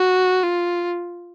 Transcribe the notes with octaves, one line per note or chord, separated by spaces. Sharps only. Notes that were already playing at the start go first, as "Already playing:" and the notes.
Already playing: F#4
F4